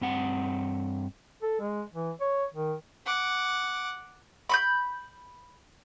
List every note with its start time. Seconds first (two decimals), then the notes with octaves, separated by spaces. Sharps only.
0.01 G2 C4 F#5
1.42 A4
1.60 G#3
1.94 E3
2.21 C#5
2.54 D#3
3.05 F#5 D6
4.49 B5 C#6 G6